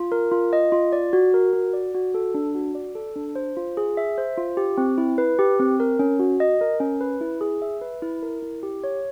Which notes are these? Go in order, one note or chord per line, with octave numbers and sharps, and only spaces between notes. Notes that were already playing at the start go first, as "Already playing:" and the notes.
Already playing: F4
A#4
F4
D#5
F4
D5
F#4
A#4
F#4
D5
F#4
A4
D4
F#4
D5
A4
D4
C5
F4
G#4
E5
C5
F4
G4
C4
E4
B4
G4
C4
A#4
C#4
F#4
D#5
A#4
C#4
B4
E4
G#4
E5
B4
E4
A#4
E4
G4
C#5